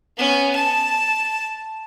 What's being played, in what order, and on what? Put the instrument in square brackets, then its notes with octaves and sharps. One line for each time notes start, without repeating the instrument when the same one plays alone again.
[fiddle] B3 C#4
A5